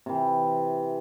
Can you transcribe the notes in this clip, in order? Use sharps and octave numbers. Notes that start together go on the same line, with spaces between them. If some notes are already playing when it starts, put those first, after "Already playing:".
C3 E3